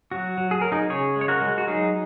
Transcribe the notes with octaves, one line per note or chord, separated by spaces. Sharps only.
F#3 F#4
F#3
G#4
F#3 A#4
D#4 G#4
C#3 G#4 C#5
G#3
C#5
F#4 A#4
G#3
F#4
F#3 D#4 G#4